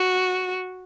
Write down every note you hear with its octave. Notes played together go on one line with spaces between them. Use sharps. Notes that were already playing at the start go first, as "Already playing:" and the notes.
Already playing: F#4